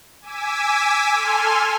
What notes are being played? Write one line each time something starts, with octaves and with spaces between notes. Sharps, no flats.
G#5 D6 E6 B6
A4 G#5 C6 F6